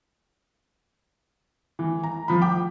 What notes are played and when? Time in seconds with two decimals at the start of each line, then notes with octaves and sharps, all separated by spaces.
1.79 E3
2.03 A#5
2.28 F3 B5
2.41 G5 D6